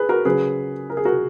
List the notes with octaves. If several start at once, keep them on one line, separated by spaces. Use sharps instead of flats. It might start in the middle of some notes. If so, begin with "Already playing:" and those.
Already playing: G#4 B4
F#4 A#4
C#3 F#3 G#4 B4
A#4
G#4
F#4 A#4